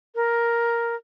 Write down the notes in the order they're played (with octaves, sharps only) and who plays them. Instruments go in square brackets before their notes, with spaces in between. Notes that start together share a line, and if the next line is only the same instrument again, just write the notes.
[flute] A#4